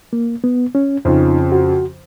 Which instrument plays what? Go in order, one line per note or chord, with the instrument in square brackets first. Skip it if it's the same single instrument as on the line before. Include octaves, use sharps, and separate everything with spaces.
[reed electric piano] A#3
B3
C#4
[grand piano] F2 C#3 F3 [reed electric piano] D#4
[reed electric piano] F#4